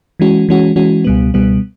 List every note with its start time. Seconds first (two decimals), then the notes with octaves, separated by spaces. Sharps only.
0.20 E3 G#3 C#4 F#4
0.49 E3 G#3 C#4 F#4
0.76 E3 G#3 C#4 F#4
1.04 C#2 B2 G3 B3
1.34 C#2 B2 G3 B3